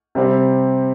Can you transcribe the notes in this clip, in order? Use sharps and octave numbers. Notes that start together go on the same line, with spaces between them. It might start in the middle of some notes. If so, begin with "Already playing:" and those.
C3 G3 C4